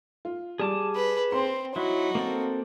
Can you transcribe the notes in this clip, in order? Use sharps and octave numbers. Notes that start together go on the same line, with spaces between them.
F4
G3 G#4 A5 D6
B4
C4 C6
F#3 D#4 E4 F#4
A#3 C4 A4